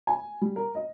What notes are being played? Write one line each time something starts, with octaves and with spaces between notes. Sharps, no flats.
G#5
G3
A#4
D#5